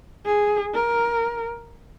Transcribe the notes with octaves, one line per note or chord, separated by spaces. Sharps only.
G#4
A#4